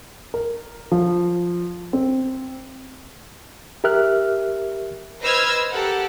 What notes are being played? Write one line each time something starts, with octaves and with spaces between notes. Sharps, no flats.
A#4
F3
C4
G4 A#4 E5 F6 F#6
B4 C5 D#5 E6 F6 G#6
G4 A4 A#4 F#5